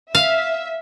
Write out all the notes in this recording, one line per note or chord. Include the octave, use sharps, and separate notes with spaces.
E5 F5